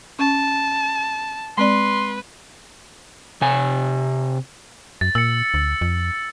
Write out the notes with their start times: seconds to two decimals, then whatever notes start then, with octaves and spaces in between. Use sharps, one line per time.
0.19 C#4 A5
1.58 G#3 C4 B4 D5 C6
3.41 C3 G#5
5.01 F#2 A6
5.15 A#2 E6 C#7
5.54 D2
5.81 F2